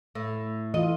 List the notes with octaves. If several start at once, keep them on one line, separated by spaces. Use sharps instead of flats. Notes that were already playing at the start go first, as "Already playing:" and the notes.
A2
E3 F4 D#5